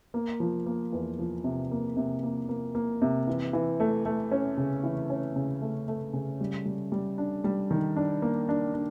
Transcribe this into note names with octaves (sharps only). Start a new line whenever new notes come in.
A#3
F3
A#3
E2
F3
C3
A#3
C3
A#3
A#3
A#3
C3
E3
E3
A3
A3
C#4
C#3
E3
C#4
C#3
A3
A3
C#3
G3
G3
G3
D4
G3
D#3
D4
A#3
D4
D4